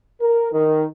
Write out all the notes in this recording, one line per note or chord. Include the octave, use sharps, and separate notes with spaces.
A#4
D#3